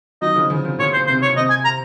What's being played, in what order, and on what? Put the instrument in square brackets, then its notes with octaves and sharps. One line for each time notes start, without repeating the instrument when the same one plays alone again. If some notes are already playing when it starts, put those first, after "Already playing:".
[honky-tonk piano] D#3 F#3 [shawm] D#5
[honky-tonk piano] C#3 F3
C#3 F3
C#3 F3
[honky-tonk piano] A#2 C#3 [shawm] C#5
[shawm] C5
[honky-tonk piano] C3 [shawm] C5
[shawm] C#5
[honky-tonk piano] C3 [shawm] D#5
[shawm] G#5
A#5